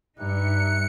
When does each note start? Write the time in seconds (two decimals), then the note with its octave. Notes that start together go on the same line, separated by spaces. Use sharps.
0.17 G2 G3 D#4 E5 A#5 F#6 C#7